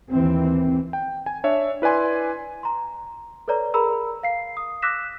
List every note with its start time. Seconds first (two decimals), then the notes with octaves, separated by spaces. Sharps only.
0.10 D#2 E3 C4
0.93 G5
1.26 G#5
1.44 D4 C#5 E5
1.82 E4 B4 D5 G#5 C6
2.63 A#5 C6
3.48 A4 B4 C#5 D5 A#5
3.74 G#4 A#4 A#5 B5 E6
4.23 F5 C7
4.57 D#6
4.82 D6 E6 F#6 A#6 B6 E7